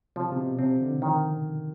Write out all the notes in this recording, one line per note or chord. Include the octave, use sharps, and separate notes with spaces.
C3 F3
C3
B2
C3 C4
D3
D#3 F3